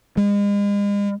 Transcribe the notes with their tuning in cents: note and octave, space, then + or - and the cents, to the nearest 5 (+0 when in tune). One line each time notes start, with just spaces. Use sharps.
G#3 -40